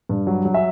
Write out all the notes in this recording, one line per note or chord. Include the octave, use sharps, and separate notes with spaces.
G2
F#3
F#3
E5